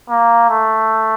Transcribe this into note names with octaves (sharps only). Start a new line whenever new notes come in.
A#3
A3